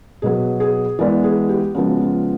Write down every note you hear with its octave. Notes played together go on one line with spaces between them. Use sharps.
B2 F#3 B3 G#4
G#4
E3 G#3 B3 D5
G#4
G4
C#3 F3 G#3 B3 F#4
F4